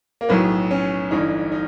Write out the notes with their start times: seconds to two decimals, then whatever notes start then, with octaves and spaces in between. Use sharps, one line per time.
0.21 A#3
0.29 B1 A2 F#3 B3
0.71 C#4
1.11 G1 G2 E3 D#4
1.52 D#4